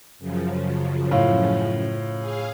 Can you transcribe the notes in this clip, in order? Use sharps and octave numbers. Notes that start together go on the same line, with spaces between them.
F#2 C#3 F3
A2 F4
G#4 F5